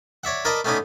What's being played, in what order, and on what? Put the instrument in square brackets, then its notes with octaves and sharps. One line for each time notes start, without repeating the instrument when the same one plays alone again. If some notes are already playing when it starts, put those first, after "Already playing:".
[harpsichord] C#5 D5 E5 F#5
A#4 B4 D5 D#5 A5 A#5
A3 B3 C#4 D#4 D5 G#5